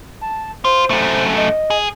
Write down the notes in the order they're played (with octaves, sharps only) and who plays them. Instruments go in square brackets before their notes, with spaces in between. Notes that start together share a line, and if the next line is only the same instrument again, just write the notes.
[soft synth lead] A5
[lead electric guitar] F4 [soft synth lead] C5
[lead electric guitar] F#2 A3
[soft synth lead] D#5
[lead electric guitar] G#4